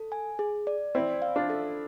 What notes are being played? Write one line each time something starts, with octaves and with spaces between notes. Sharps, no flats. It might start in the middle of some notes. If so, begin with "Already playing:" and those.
Already playing: A4
G#5
G#4
D5
C4 E4 D5
F5
D4 F4
A4